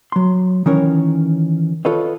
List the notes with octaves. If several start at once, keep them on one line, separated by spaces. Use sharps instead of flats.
F#3 C6
D#3 E3 C#4 A#4 C#5
F4 A4 B4 C#5 D#5